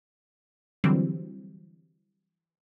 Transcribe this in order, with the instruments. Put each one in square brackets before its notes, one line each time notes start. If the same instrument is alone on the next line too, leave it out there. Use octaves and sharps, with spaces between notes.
[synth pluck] D3 E3 F#3 G3 C4